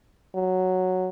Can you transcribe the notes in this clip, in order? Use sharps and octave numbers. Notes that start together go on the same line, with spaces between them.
F#3